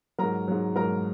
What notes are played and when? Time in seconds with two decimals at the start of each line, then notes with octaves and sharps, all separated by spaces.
0.19 G#2 F#3 A#4 A#5
0.48 G#2 F#3
0.76 G#2 F#3 A#4 A#5